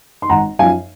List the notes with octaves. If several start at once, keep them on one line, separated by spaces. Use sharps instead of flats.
C6
G#1 F#5 A#5
F#2 F3 F5 G#5